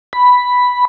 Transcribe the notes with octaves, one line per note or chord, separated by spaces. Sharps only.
B5